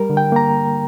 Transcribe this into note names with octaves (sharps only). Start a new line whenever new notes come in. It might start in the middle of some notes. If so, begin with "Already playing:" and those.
Already playing: G3 A#4
D3
G5
A#3 A#5